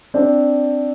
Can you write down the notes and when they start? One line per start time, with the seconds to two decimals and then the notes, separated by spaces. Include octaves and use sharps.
0.14 C4 D4